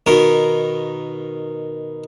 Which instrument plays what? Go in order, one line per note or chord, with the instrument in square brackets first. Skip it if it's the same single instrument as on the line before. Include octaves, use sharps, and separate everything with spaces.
[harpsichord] B2 D#3 A#4